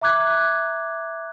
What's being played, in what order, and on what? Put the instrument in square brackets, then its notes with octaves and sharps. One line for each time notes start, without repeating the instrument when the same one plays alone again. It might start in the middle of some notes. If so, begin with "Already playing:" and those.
[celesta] E5 A#5 D6 F#6 G#6